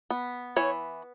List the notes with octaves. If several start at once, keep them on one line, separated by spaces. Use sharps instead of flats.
B3
E3 C#5